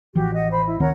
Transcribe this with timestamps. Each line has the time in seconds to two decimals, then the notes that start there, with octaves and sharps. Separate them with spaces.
0.15 A1 E3 F3 F#4 G4
0.35 D#5 F#5
0.51 C5 B5
0.67 E4
0.80 D2 D#3 C4 A#4 C#5 F#5